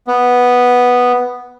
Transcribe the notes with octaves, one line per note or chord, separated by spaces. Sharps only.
B3